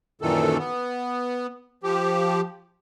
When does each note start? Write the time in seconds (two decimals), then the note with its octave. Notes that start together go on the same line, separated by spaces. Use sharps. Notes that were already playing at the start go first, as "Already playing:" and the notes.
0.22 F#2 A#2 D#3 E3 A4
0.58 B3
1.83 F3 G4